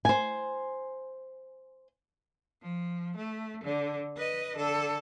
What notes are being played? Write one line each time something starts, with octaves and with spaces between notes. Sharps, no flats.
C5 G#5
F3
A3
D3
B4 D#5
D3 A4